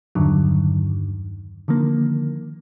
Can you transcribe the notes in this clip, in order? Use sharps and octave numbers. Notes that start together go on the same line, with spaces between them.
E2 G2 D3 D#3 F#3
D3 D#3 F3 A#3